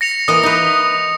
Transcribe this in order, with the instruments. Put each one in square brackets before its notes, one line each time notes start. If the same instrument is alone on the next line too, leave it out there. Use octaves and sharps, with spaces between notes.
[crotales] A#6 C#7 F7
[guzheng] E3 A#3 D#5 [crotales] D#6
[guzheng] D#4 B4